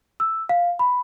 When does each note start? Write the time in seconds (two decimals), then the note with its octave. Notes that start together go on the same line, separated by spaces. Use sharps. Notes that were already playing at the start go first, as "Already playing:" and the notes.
0.20 E6
0.49 F5
0.79 B5